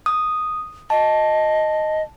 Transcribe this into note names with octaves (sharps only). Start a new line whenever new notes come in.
D#6
D#5 A5